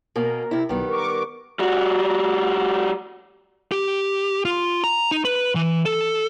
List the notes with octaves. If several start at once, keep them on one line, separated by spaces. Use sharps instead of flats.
B2 A#3 C#4 A#4
C3 E4
B1 D#3 G3 B3
A#4 C#6 D6
G3 F#4
G4
F4
A#5
D#4
B4
E3
A4